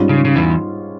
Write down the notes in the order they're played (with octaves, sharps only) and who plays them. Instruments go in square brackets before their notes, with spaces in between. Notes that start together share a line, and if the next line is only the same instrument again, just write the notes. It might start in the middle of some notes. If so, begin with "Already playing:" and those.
Already playing: [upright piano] G#2 G3 C#4 F4
[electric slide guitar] C#3
C#3
E2 E3